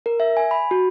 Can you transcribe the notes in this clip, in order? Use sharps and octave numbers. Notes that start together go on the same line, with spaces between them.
A#4
E5
G#5
B5
F#4